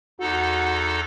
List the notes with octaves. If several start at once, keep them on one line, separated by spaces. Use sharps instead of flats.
E2 D#4 F#4 A4